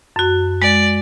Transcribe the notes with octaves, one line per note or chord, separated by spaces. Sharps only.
F#2 F#4
G#3 D5